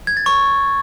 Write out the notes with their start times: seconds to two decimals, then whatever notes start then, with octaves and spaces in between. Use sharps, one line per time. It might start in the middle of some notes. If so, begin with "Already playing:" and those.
0.07 G#6
0.17 A6
0.26 C#6